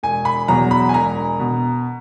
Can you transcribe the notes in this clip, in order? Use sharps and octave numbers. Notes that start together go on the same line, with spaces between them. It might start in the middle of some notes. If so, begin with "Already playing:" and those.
E1 G#5
B5
E2 B2 F#3 A#5
B5
G#5
E1 A#5
B2